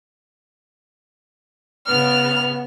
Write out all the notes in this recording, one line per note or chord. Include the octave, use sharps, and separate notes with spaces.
C#3 B3 F6